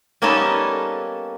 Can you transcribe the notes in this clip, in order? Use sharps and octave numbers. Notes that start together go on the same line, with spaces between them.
G3 A#3 B3 C#4 D#4 A4